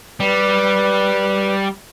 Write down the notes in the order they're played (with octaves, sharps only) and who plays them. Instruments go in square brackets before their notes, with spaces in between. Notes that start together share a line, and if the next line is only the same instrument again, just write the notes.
[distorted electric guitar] G3 [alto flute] B4